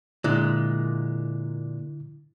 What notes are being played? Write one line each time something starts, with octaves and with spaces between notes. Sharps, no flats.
A#2 D3 G#3 E4 F#6